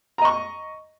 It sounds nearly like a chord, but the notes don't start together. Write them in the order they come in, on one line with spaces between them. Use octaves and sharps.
A#5 D#5 C#6